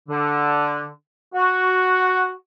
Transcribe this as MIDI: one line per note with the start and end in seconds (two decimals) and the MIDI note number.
0.09 0.86 50
1.34 2.32 66